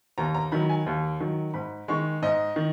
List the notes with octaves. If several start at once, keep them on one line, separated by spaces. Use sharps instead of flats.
D#2 A#5
A#5
D#3 F#3 B5
G#5
D#2
D#3 F#3
G#2 B5
D#3 G#3 C#6
G#2 D#5
D#3